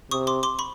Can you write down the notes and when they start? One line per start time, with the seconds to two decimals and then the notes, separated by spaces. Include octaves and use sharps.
0.11 C3 C#6 D#6
0.27 C6 D6
0.43 C6 D6
0.59 B5 C#6